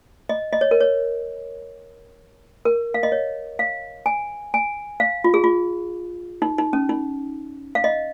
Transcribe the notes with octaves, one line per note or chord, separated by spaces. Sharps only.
D#5
D#5
C#5
A#4
C#5
A#4
F5
D#5
C#5
F5
G#5
G#5
F5
F4
G#4
F4
D#4
D#4
C#4
D#4
F5
D#5